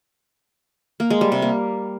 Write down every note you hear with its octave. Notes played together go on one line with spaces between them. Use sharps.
A#3
G#3
G3
C3
A#3